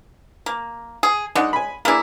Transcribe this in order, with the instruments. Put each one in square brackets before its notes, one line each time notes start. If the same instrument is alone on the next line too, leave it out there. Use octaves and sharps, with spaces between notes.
[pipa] A#3
G#4
[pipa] G#3 [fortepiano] D4 D#4 F#5
[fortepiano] G#5 B5
[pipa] A#3 E4 [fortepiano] D4 G#4 B4